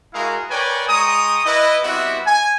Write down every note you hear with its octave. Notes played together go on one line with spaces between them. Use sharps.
G#3 E4 F#4 G#4 A#4 F5
A#4 B4 C#5 D5 G5 G#5
G#3 G5 A#5 C#6 D#6
E4 B4 D#5
G3 B3 C4 E4 F#4 E5
G#5